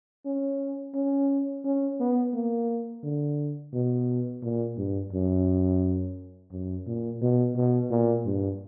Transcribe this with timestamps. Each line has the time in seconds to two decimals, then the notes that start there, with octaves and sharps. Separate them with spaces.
0.26 C#4
0.95 C#4
1.65 C#4
2.00 B3
2.34 A#3
3.04 D3
3.73 B2
4.43 A#2
4.77 G2
5.13 F#2
6.52 F#2
6.86 A#2
7.22 B2
7.56 B2
7.91 A#2
8.26 G2